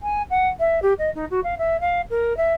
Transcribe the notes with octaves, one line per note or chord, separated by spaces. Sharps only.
G#5
F#5
E5
G4
D#5
D#4
F#4
F5
E5
F5
A#4
E5